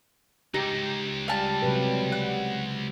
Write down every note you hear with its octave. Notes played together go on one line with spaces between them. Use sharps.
C#2 D#4 G4
G3 F5 A5
C3 F#3 B4
F#5